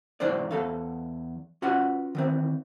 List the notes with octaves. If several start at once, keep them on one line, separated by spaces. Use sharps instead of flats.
G#2 E3 D4 E4 C5 D5
E2 A4 F5
C#4 F4 F#4 B4 F#5
D#3 E3 C4